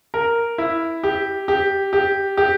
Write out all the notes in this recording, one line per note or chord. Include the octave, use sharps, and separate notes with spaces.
A#4
E4
G4
G4
G4
G4